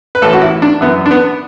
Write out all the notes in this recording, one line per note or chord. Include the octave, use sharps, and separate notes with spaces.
B4
A1 A2 E3 A4
F#4
E4
D4
F#2 E3 B3
D4
B3